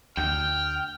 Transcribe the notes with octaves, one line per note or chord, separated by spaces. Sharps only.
D2 G5 F6 G6